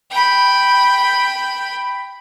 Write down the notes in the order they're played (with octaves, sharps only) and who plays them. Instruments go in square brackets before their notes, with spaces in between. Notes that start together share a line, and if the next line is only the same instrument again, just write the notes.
[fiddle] G5 B5